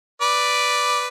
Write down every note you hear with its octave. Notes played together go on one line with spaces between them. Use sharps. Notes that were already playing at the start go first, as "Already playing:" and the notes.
B4 D5